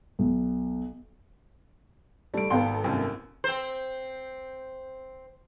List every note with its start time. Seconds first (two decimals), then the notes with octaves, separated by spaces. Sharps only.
0.19 B1
2.34 G3 A3 D7
2.50 G#1 B3 A4 F5 G5 C6
2.84 C2 F#2 A#3
3.44 C4 C5